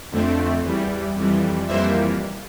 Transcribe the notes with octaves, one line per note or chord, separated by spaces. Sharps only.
F2 D3 A3 C4
E2 E3 G3
F2 E3 G3
F2 E3 G3 A#3 C5 E5